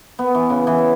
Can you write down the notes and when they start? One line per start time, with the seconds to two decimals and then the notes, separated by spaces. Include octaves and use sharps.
0.19 B3
0.35 E3
0.50 C#3
0.67 E3